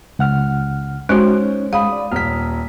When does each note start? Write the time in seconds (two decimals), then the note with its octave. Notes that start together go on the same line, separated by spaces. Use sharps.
0.19 C#2 F#5 F6
1.09 G#3 C#4 D#4 F#4 C5 C#5
1.73 G#3 F5 B5 D#6
1.92 D5
2.12 D#1 F6 B6